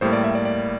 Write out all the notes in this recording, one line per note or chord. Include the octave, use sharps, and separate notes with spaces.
A2 G3 A#3 C5
D5
E5
D5
D5